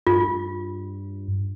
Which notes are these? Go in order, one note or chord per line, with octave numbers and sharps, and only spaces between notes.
G2 F4